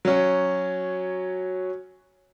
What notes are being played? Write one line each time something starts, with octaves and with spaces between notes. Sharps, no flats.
F#3 C#4